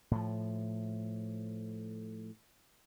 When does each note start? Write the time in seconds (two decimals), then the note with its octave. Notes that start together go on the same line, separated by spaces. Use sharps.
0.11 A2 F3